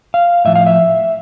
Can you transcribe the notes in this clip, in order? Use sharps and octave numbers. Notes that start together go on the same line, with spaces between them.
F5
A2 F3 E5
F5
E5